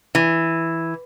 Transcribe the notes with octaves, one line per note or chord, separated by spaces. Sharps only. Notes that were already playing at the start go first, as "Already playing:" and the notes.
E3